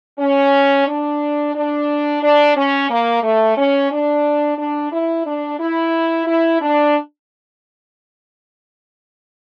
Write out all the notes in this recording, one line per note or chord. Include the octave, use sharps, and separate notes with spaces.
C#4
D4
D4
D4
C#4
A#3
A3
C#4
D4
D4
E4
D4
E4
E4
D4